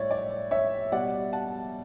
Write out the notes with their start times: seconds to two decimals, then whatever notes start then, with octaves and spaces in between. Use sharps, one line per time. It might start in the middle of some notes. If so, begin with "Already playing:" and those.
Already playing: A2 G3 C#5 D5 E5
0.11 D5
0.51 C#5 E5
0.92 B2 G3 D5 F#5
1.33 F#5 A5